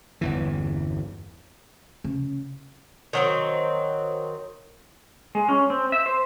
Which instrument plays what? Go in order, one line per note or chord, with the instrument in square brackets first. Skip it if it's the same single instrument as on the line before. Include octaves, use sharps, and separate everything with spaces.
[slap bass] G1 E2 E3
[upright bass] C#3
[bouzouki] D#3 F#3 C4
[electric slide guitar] G#3
C#4
C4
E5
C5